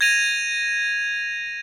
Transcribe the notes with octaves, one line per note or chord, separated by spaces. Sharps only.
G#6 A#6 D#7 F7